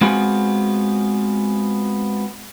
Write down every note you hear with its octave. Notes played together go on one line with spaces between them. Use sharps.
G#3 B3 C4 F4 F#4 G#4